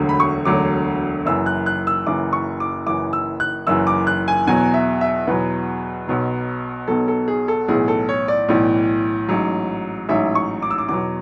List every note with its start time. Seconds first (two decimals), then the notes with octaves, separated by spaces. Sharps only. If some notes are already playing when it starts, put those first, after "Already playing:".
Already playing: E1 D2 D3 F#3
0.09 B5
0.20 C#6
0.45 E1 D2 D3 F#3 D6
1.26 F#1 F#2 E3 E6
1.46 F#6
1.66 F#6
1.87 E6
2.06 F#1 F#2 E3 D6
2.33 C#6
2.60 D6
2.87 F#1 F#2 E3 D6
3.13 E6
3.40 F#6
3.67 F#1 F#2 E3 E6
3.87 D6
4.07 F#6
4.28 G#5
4.47 E2 B2 F#3 G#5
4.74 E5
5.01 E5
5.27 E2 B2 F#3 B4
6.08 B1 B2 F#3
6.88 B1 B2 F#3 A4
7.08 A4
7.28 G#4
7.48 A4
7.68 B1 A2 E3 G#4
7.88 A4
8.09 C#5
8.28 D5
8.49 B1 A2 E3
9.29 A1 G#2 F#3
10.09 A1 G#2 F#3 E5
10.35 C#6
10.62 D6
10.71 E6
10.78 D6
10.89 E2 B2 F#3 D6